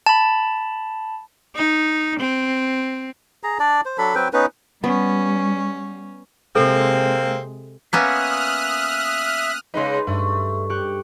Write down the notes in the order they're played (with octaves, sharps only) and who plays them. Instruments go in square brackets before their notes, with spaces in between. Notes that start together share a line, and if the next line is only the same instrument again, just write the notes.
[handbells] A5 B5
[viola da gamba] D#4
C4
[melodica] G#4 A#5
D4 D5
C5
F#3 D4 A4 B5
F#3 C4 B4 G5
B3 C#4 D#4 B4
[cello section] G3 [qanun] B3 [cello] C#4
[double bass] C3 G#3 [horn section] A#3 C4 [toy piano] A4
[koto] A#3 B3 C#4 [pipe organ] E5 [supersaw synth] D#6 F6 F#6
[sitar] C#3 G#3 D#4 [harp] B4 C6
[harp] G2 [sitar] A3
[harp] G4 C#6 F#6